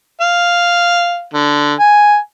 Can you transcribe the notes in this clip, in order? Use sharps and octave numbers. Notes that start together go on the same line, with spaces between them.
F5
D3
G#5